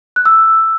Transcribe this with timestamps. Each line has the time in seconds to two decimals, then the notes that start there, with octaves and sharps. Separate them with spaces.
0.16 F#6
0.26 E6